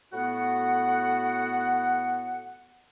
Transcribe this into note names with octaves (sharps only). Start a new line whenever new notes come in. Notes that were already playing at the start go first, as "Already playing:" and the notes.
A2 B3 F#4 F#5